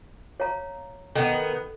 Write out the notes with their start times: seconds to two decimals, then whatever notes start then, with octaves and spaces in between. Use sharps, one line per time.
0.40 C#5 F5 A#5
1.16 D#3 B3 A4